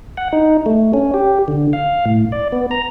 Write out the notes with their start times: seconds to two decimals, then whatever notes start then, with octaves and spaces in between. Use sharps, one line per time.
0.17 F#5
0.33 D#4
0.66 A3
0.94 C#4
1.14 G4
1.48 D3
1.73 F5
2.06 A2
2.32 D5
2.52 B3
2.71 A#5